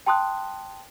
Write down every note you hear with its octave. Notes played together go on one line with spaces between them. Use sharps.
G5 A5 C6 D#6 F#6